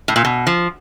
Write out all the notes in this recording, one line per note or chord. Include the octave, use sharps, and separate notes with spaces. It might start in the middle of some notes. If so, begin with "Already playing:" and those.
A2
A#2
B2
F3